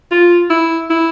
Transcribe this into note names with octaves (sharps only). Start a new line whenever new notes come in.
F4
E4
E4